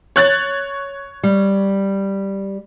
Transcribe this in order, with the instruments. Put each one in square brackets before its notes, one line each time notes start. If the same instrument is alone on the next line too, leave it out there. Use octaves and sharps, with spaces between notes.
[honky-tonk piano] C#5 F#6 A6
[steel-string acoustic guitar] G3